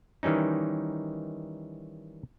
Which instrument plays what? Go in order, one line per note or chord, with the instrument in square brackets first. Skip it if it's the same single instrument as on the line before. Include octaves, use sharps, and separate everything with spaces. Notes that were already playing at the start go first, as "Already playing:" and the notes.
[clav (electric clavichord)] D#3 E3 G3 C#4 D#4